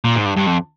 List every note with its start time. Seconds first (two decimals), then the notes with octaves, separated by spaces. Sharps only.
0.05 A#2
0.16 G#2
0.26 G2
0.37 G2
0.47 F2